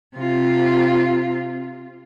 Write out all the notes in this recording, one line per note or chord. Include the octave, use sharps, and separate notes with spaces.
C3 F4